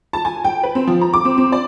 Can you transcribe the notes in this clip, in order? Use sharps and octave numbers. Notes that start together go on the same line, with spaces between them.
A5
G#5
G5
B4
C4
F3
A#5
D6
C4
C4
D5